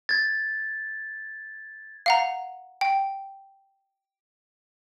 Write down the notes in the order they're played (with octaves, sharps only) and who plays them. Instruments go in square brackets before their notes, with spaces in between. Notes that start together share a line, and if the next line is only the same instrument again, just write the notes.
[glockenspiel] G#6 A6
[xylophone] F5 F#5 A#5
G5